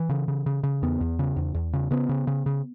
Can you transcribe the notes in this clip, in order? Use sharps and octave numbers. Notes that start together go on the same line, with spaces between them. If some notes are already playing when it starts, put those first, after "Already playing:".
Already playing: E3
C#3
C#3
C#3
C#3
E2 B3
E2
C#3
E2
E2
C#3
C#3 B3
C#3
C#3
C#3